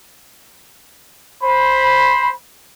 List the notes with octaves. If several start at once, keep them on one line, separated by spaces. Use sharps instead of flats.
C5 B5